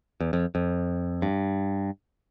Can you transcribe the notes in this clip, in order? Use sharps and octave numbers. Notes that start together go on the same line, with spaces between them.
E2
F2
F2
G2